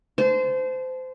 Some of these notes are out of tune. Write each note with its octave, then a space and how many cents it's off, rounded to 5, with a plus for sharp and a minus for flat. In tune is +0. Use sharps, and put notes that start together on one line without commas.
C5 -25 A5 -30